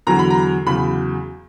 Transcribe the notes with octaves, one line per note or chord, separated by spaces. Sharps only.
E2 D3 F#3 A#5
B5
A#5
E2 C#3 F#3 B5